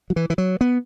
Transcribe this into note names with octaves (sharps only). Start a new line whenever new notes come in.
F#3
E3
E3
F#3
B3